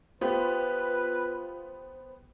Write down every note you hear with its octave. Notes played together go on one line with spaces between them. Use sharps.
B3 F4 G4 B4 C5